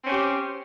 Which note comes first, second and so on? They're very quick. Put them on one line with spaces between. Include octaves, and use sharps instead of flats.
C4 C#4 C5 G4